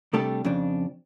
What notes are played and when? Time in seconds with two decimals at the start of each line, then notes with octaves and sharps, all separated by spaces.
0.13 C3 G3 A3 D4 G4 A4
0.45 F2 C#3 D4